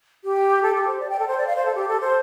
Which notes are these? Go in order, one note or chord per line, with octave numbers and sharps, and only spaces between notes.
G4
A4
G4
C5
D5
G5
A4
C5
D5
F5
C5
A4
G4
A4
C5